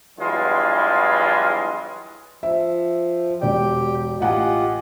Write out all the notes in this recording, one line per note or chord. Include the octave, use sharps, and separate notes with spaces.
E2 G2 E3 F#3 G#3 F4
F3 E5
E1 G4 D5 G5
A1 F4 G4 D#5 F#5 G#5